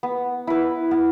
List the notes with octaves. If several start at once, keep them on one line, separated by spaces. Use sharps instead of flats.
B3
E4 B4
B3